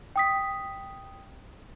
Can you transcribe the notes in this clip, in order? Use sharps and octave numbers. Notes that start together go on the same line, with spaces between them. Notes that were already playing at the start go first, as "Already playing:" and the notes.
G5 D#6 B6